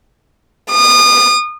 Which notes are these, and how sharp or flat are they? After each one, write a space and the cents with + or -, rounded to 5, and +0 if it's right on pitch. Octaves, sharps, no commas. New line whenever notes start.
D#6 -35